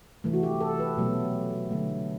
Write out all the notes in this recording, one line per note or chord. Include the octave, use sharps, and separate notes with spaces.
C3 E3 A3
F#4
G4
A4
B4
B2 F#3 A3
D3 F#3 A3